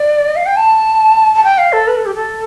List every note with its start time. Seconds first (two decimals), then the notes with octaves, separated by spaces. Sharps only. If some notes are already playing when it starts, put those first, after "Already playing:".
Already playing: D5
0.36 F5
0.46 G5
0.57 A5
1.35 A5
1.44 G5
1.58 F5
1.73 A4
1.88 B4
1.96 A4
2.06 G4
2.15 A4